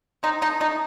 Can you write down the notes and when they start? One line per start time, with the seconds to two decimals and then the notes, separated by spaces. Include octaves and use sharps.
0.23 C4 D#4
0.42 A3 D#4
0.60 A3 D#4